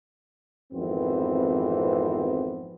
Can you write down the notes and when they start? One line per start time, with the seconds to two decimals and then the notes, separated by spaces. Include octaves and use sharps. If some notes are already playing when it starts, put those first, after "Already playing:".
0.73 G#1 F2 E3 B3 C4